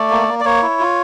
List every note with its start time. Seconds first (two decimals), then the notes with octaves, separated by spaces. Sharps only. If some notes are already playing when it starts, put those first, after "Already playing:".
Already playing: A3 D5
0.10 A#3
0.28 A#3
0.40 D5
0.45 A#3 C#5
0.62 E4
0.80 F4